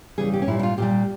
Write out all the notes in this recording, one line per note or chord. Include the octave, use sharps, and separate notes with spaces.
C#3 E3 G3 G#4
G4
C#4
A#2 G3 E4
E4
F4
A#2 G3 G4